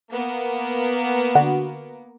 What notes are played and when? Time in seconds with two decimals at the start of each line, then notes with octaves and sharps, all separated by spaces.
0.11 A#3 B3
1.35 D3 F#4